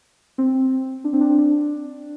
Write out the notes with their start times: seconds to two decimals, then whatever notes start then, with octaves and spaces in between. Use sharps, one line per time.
0.38 C4
1.04 D4
1.13 C4
1.21 D4
1.30 C4
1.38 D4